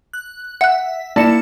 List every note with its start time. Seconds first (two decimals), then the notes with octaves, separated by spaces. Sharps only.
0.13 F#6
0.61 E5 F#5 F#6
1.16 A#3 E4 D5 A5 C#7 E7